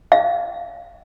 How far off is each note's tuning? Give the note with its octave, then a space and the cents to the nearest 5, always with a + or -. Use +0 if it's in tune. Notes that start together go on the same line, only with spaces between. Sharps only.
F5 -15